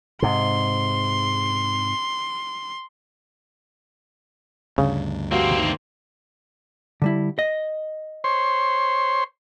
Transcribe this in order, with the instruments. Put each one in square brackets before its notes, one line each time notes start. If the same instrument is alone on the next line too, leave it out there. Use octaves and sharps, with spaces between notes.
[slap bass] G#2 C3 [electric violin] C6
[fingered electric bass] D2 G2 [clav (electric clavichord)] C#3
[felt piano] G3 F#4 F5 [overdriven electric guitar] A#3 C4
[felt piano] D#3
[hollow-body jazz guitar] D3 G3 E4
D#5
[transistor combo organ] C5 C#5 C6